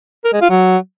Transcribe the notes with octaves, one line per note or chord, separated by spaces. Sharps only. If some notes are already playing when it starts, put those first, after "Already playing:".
A#4
G#3
F4
F#3